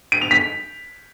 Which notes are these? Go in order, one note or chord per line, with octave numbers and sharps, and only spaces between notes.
D7
F7
B6